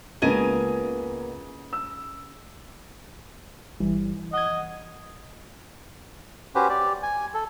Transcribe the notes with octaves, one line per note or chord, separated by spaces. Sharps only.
C#2 C#3 A#3 B3 D#5 G#5
E6
G1 E3 G3
D#5 F#5 G#6
C#4 F#4 G4 B4 C5
G4 D5
G#5
A4